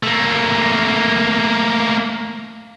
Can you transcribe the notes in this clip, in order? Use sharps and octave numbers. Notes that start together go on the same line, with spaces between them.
A3 A#3